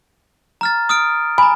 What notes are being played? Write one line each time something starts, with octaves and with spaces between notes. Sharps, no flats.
A#5 F6 A6
D#6 F6 D7
G#5 A#5 B5